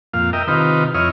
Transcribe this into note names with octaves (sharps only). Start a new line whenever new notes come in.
F2 A#2 F5
A#4 D#5 E5 G5
C3 D#3 D#4 F4 B4
F2 E4 C#5 D#5 F6